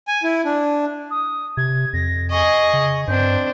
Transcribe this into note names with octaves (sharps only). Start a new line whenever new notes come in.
G#5
E4
D4
D#6
C3 G#6
F2 A#6
G#4 D#5 C#6
C#3
G2 C4 D4 G6